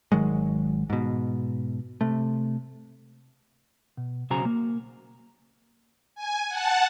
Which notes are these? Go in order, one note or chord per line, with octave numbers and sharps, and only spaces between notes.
G#1 D#3 F#3 G#3
G#2 B2
C3 A3
B2
B1 C#3 F#4 C5 G#5 A#5
A#3
G#5
F#5 A5